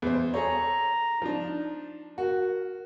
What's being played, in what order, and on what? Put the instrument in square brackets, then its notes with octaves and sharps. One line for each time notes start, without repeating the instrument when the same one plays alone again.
[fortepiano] E2 C5
[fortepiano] G#4 A4 C#5 [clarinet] A#5
[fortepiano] F3 D4 [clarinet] D#4
[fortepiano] F#4 [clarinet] A#4